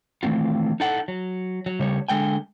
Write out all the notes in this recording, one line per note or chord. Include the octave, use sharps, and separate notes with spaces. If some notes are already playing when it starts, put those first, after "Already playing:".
D#3 E3 A3 C4 F4
D#4 E4 A4 F#5
F#3
F#3
C#3 G3 C#5
D3 G#3 G5 G#5